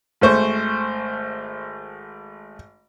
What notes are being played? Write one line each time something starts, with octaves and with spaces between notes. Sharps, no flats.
G#1 A3 C5 C#6